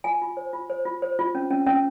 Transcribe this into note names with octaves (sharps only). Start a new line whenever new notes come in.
F4 G#5
F4
C5
F4
C5
F4
C5
F4
C#4
C#4
C#4